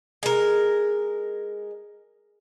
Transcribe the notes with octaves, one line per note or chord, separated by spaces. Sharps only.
G#3 A#4